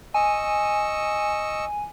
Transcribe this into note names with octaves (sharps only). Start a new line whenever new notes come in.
D#5 G#5 C#6 E6